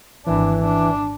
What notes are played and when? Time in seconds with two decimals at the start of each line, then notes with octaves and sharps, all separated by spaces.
0.26 G#1 E3 D4
0.62 D4